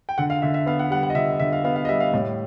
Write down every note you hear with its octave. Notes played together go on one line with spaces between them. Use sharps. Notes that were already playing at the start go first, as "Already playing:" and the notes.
G5
D3 F#5
F5
D3 E5
E5
B3 F5
F#5
G3 F#5
F#5
D#5
D3 E5
D3 E5
F5
B3 F5
F5
D#5
G3 E5
F5
A2